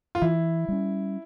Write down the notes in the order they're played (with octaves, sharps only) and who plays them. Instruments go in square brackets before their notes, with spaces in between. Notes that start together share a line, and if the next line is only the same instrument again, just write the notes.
[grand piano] F4
[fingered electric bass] E3 [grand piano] E4
[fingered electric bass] G3 C#4